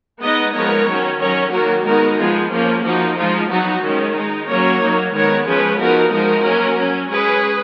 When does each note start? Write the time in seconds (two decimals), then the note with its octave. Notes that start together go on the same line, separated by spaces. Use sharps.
0.22 G#3 B3 D#4 B4 D#5
0.55 F3 G#3 B3 D#4 A#4 C#5
0.88 D#3 F#3 C#4
1.21 D#3 F#3 C#4 A#4 C#5
1.53 D#3 F#3 A#3 F#4 A#4
1.86 G#3 B3 D#4 F#4 A#4
2.19 F3 G#3 B3 F4 G#4
2.52 F3 A#3 C#4 F4
2.85 F3 A#3 D#4 F#4
3.17 F3 G#3 D#4 F4
3.50 F#3 B3 D#4 F#4
3.83 D#3 G#3 C#4
4.16 G#3 D#4
4.49 F#3 A#3 C#4 A#4 C#5
4.82 F#3 A#3 D#4
5.14 D#3 G#3 B3 A#4 C#5
5.47 F3 G#3 C#4 G#4 B4
5.80 F3 B3 D#4 F#4 A#4
6.13 F3 G#3 D#4 F#4 A#4
6.46 F#3 A#3 C#4
6.79 F#3 C#4
7.11 G#3 C#4 G#4 B4